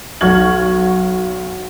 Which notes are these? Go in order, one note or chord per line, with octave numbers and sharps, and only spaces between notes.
B1 F#4 C#6 F6 G#6 F#7